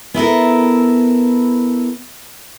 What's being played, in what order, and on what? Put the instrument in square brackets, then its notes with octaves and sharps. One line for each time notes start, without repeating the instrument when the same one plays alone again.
[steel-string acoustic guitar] B3 E4 A4 A#4